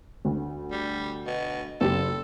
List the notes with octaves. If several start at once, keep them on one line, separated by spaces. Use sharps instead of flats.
D2
G3
B2
F#1 G4 A4